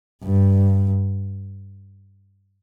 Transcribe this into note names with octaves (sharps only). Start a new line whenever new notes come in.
G2